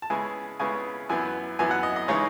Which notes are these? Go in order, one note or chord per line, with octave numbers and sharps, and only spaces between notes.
A5
C#3 G#3 B3 E4 G#5
C#3 G#3 B3 E4 G#5
F#2 E3 B3 G#5
F#2 E3 B3 G#5
F#5
D#5
D#5
C#3 E3 G#3 D#4 C#5